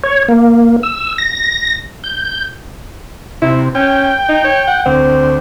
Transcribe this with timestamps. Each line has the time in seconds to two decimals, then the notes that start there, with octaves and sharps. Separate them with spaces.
0.04 C#5
0.28 A#3
0.83 E6
1.18 A#6
2.04 G6
3.42 C3 E4
3.75 C#4 G5
4.29 D#4
4.44 C#5
4.67 F#5
4.86 D2 C4